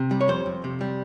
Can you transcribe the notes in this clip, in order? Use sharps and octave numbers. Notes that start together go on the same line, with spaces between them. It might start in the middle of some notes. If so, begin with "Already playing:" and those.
Already playing: C3
G3
C#5
F2 C5
F2
C3
G3